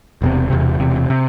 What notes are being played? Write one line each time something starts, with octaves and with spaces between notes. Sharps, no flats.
E1 E2 C3
E1 E2 C3
E1 E2 C3
C3